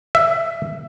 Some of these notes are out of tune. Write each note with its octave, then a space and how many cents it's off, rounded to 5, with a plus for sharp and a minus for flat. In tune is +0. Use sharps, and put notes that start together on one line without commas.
E5 +15